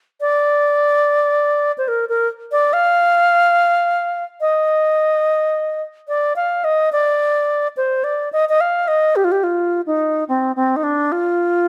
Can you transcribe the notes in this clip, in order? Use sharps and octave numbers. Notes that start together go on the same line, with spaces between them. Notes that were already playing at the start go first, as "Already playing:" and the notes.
D5
C5
A#4
A#4
D5
F5
D#5
D5
F5
D#5
D5
C5
D5
D#5
D#5
F5
D#5
G4
F4
G4
F4
D#4
C4
C4
D#4
D4
F4